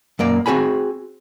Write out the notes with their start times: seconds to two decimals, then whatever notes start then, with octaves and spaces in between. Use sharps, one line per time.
0.19 F#2 A#3 D5
0.46 C4 F#4 G#4 G#5 B5